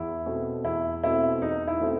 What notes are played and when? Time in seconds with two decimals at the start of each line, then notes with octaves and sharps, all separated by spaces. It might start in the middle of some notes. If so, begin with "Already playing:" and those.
Already playing: E2 E4
0.26 B2 A3 C4
0.64 E2 E4
1.03 B2 A3 C4 E4
1.42 E2 D#4
1.68 E4
1.80 B2 A3 C4